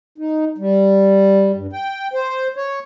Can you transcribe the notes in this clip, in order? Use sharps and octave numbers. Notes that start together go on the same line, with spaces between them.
D#4
G3
G2
G5
C5
C#5